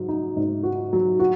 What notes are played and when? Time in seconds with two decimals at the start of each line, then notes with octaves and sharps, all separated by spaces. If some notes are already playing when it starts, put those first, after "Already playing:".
Already playing: G#2 F#3
0.09 D#4
0.37 G#2
0.63 F#4
0.93 F#3
1.20 F#4